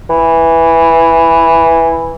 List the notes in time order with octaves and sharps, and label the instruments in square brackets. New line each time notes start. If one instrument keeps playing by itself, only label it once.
[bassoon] E3